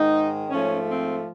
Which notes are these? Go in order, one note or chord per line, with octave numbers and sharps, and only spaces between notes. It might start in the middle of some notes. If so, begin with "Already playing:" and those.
Already playing: G#2 D#3 G#3 D#4
G#2 F3 A3 C#4
C4